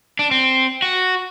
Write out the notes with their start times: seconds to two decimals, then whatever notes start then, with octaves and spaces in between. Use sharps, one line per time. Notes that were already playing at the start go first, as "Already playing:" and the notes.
0.19 D4
0.31 C4
0.82 F#4